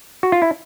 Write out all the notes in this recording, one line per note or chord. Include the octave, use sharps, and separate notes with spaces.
F#4
F4
E4